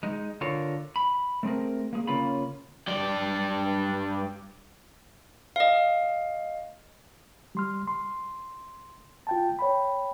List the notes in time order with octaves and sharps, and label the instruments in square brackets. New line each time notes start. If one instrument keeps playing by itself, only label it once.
[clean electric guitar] G#3 D#4
D3 F4 A#4 C#5
B5
A3 C4 G#4 A#4
A#3 G#4
C#3 A#3 C#4 F4 B5
[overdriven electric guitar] G2 D5
[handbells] D#5 F5
[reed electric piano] G3 C6 F6
C6
F4 G5 A5
C#5 G5 B5